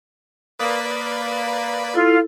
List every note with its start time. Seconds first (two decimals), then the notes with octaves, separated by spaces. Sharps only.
0.59 A#3 B4 D5 B5 D#6
1.94 E4 F4 A4 F5